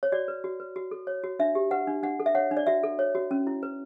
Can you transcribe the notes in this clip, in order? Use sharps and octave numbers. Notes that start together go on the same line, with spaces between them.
C#5
F#4 D5
B4
F#4
B4
F#4
A4
C#5
F#4
D4 E5
G4
B4 F#5
D4
D4 F#5
A4
E5
C#5 F#5
D4
D5
F#4 E5
A4
C#5
F#4
C#4
E4
B4